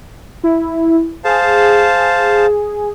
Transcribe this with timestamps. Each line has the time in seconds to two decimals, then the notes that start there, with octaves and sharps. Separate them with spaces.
0.44 E4
1.25 G#4 C5 F5 A5